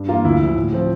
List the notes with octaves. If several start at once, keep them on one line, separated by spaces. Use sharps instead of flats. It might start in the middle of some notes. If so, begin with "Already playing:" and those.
Already playing: G2
E3 A#3 F4
D2 E4
D3 F3
A2
F3 C4